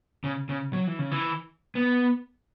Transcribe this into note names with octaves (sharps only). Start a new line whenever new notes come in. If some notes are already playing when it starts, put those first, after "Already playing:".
C#3
C#3
F#3
E3
C#3
E3
B3